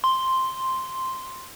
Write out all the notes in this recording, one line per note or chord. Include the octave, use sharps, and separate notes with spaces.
C6